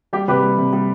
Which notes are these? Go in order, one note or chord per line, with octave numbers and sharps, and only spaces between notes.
G3 G4
C3 G4 B4
G3
C3
G3